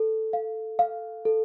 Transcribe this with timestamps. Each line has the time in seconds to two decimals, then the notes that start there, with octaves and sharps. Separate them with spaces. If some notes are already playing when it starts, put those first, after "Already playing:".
Already playing: A4
0.33 F5
0.79 F5
1.25 A4